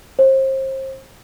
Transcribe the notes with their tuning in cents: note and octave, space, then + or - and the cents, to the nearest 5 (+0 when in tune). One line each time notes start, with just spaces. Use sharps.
C5 +30